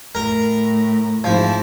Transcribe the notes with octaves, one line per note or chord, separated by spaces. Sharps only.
A2 A#4
G#2 F3 C4 E4